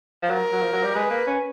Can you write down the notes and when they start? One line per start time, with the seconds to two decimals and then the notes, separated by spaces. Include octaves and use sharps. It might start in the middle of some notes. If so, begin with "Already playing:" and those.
0.22 F3
0.30 F#3 A#4
0.52 F#3
0.62 F3
0.73 F#3
0.83 G3
0.95 G#3 B4
1.10 A#3
1.27 C#4